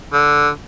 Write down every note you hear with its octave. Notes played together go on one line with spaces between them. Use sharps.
D3